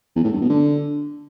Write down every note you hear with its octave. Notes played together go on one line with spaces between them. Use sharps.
E2
A2
G2
B2
D3